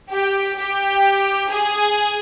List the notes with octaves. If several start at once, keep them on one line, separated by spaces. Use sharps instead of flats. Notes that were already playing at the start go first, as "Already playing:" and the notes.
G4
G4
G#4